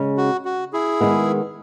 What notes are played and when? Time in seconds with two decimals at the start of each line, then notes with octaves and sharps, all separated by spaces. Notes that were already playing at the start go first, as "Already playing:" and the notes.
Already playing: C#3 G#3 C#4
0.17 F#4
0.45 F#4
0.73 E4 G#4
1.01 D#3 G#3 B3